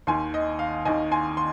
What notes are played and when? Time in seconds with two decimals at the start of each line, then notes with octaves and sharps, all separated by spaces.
0.07 D#2 D#3 G#5 C6
0.34 D#5
0.59 F5
0.85 D#2 D#3 D#5 G#5
1.11 G#5 C6
1.37 C6